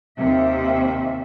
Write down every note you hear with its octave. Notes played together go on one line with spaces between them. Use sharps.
D#2 C3 E5